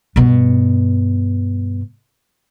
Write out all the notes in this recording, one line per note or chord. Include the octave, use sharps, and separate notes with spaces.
G2 B2